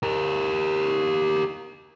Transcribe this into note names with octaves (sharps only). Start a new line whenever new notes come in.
G4 A#4